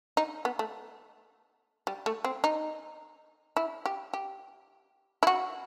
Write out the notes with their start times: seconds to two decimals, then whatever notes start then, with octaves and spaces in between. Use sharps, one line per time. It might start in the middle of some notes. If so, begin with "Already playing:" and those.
0.17 D#4
0.45 B3
0.59 A3
1.87 G3
2.06 A3
2.25 C4
2.44 D#4
3.57 E4
3.86 G4
4.14 G4
5.23 E4
5.27 F#4